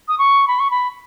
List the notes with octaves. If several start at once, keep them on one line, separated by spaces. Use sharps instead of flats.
D#6
C#6
B5
C#6
B5